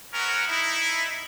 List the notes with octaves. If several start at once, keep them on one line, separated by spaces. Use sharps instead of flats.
B3 C#4 F#4 A#4
D#4 E4